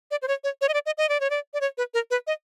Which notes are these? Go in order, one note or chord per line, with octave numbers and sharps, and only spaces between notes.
D5
C5
C#5
C#5
C#5
D#5
D5
D#5
D#5
D5
C#5
D5
D5
C#5
B4
A#4
B4
D#5